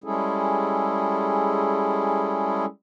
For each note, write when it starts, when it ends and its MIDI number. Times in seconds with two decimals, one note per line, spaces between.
0.04 2.65 55
0.04 2.65 56
0.04 2.65 61
0.04 2.65 64
0.04 2.65 68
0.04 2.65 69